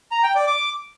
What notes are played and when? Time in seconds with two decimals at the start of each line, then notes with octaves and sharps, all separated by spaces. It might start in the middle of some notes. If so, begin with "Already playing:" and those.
0.11 A#5
0.23 G5
0.35 D5
0.47 D6